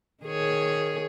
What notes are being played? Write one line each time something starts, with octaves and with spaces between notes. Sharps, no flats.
D#3 G#4 C#5